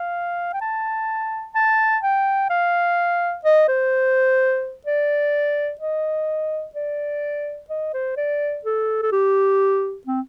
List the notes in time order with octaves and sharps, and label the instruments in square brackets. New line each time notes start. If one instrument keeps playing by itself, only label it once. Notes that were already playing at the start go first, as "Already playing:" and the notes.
Already playing: [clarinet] F5
G5
A5
A5
G5
F5
D#5
C5
D5
D#5
D5
D#5
C5
D5
A4
A4
G4
C4